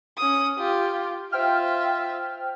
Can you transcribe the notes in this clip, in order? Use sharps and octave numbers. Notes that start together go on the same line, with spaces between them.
C#4 D#6
F4 G4
F4 C5 E5 G5 F6